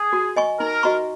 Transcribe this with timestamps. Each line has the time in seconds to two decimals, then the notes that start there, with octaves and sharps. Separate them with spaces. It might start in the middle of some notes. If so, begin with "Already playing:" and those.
Already playing: G#4
0.13 F#4
0.36 D#5 G#5 C#6
0.60 D#4 A#4
0.83 F#4 D#5 A#5 C#6